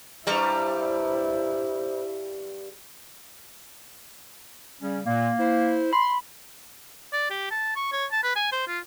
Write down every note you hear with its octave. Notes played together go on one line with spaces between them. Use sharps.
G2 G3 E4 C5 E5 A#5 C#6
C#3 G3 C#4
A#2 A#3
E4 C5
B5 C6
D5
G4
A5
C#6
C#5
A5
B4
G#5
C5
F4